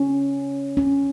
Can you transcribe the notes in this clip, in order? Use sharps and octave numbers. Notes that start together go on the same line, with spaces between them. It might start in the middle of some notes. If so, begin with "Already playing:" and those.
Already playing: C#4
C#4